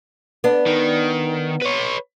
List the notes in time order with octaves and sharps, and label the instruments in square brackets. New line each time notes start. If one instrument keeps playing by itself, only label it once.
[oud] B3 D4
[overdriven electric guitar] D#3
B4 C#5